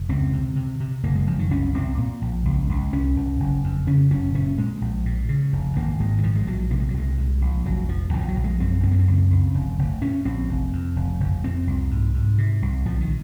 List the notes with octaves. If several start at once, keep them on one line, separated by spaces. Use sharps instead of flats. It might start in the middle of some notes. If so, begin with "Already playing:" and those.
Already playing: F1
C#2 C4
C3
C3
C3
F#1 A#3
G#3
F#1 F3
D#3
C2 C#4
C2 C4
A#2
A#1
C#2
C#2
C2 C#4
C2
F#1
F2
C#3 C#4
F#1 C#4
A#2 C#4
A#2 G#3
A#1
A#2
C#3
F1
G#1 A#3
G#1 G#3
D#3
A#2 F3
G#3
A#1 F#3
C3 A#3
G#3
F#3
C2 G#3
A#2
A#1
F1 F#3
F1 F3
A#1 D#3
F3
F#3
A#1
G#3
F#2 C4
F#2 C4
A#3
C4
C#2
C#2
F1
F1
A#2 C#4
A#1 C4
F1
F2
F1
F1
A#2 C4
C2
G#2
G#2
C3
C2
A#1 F3
D#3